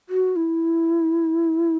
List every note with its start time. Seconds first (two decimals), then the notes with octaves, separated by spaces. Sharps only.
0.09 F#4
0.36 E4